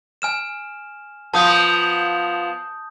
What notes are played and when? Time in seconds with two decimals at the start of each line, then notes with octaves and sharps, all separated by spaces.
0.22 G#5 F6 E7
1.34 F3 B3 A5 D#6 G6